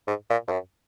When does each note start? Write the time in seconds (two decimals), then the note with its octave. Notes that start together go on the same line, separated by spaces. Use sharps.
0.07 G#2
0.30 A#2
0.48 F2
0.51 F#2